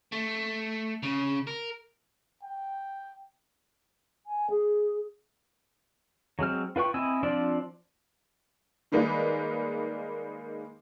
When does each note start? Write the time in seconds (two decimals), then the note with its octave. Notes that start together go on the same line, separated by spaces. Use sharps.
0.12 A3
1.03 C#3
1.47 A#4
2.43 G5
4.27 G#5
4.50 G#4
6.39 F#3 G#3 C4 F6
6.76 F4 B4 G5 C#6
6.94 C4 E4 D#5 G#5 E6
7.23 F3 C4 D4 F4 D5
8.92 D#3 G3 G#3 A#3 D#4 B4